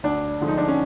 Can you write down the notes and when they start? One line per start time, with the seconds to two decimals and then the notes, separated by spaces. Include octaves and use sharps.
0.03 D2 D4
0.41 D3 F3 G#3
0.48 D#4
0.58 D4
0.68 C#4